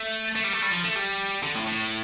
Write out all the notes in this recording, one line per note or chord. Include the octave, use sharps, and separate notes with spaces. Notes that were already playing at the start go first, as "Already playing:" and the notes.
Already playing: A3
A3
G3
A3
G3
F3
A3
G3
D3
A2
A2